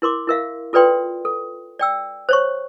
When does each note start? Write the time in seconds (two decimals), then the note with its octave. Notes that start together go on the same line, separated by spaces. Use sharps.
0.02 E4 A#4 C6 D6
0.28 E4 A#4 E5 F5
0.73 F4 A4 B4 D5 G5 C6
1.25 A4
1.79 D5 G5 E6
2.29 C5 C#5 C#6